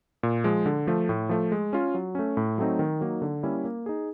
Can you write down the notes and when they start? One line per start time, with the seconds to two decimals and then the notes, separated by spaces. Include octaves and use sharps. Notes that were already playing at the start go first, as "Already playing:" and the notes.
0.23 A#2
0.44 F3 G#3
0.66 D3
0.87 F3 A3
1.09 A2
1.29 F3 A3
1.52 G#3
1.73 C#4 F4
1.94 F#3
2.15 A3 C#4
2.37 A2
2.58 F#3 A3 C4 D#4
2.79 D#3
3.01 F#3 A#3 D#4
3.22 D3
3.43 G3 A#3 C#4 E4
3.65 A#3
3.86 D#4 G#4